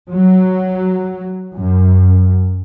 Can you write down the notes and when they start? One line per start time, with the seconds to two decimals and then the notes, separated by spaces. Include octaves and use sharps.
0.12 F#3
1.56 F#2